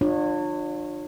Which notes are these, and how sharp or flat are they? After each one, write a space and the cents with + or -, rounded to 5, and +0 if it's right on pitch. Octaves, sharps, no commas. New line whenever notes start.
D4 +40 F4 +25 C#5 -15